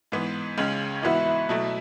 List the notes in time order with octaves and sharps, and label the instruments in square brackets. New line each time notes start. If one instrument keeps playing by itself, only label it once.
[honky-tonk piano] G#2 E3 B3
C#2 C#3 G#3 C#4
[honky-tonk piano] G#2 E3 B3 F#4 [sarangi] E4
[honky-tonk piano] B2 F#3 A3 E4